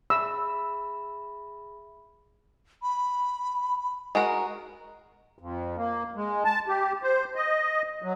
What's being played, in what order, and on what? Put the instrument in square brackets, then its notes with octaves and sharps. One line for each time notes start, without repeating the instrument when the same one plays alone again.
[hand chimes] G#4 E5 B5 [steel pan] E6
[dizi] B5
[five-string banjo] G#3 F#4 A#4
[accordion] F2
A#3
G#3
A5
G4
C5
D#5
F#3